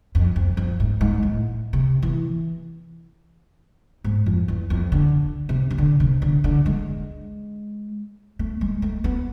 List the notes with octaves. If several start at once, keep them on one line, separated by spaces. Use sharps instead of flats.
F2
F2
F2
G#2
G#2
A2
C3
E3
G#2
F2
E2
F2
D3
C3
C3
D3
C3
D3
D3
G#3
A3
G#3
A3
B3